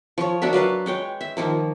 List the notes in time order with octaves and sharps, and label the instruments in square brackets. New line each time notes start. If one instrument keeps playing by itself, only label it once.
[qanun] F3 C#5
D4 F#4 A#4 E5
F#3 B4 F5 A5
G#3 C#5 G5
E5
D#3 F3 A#3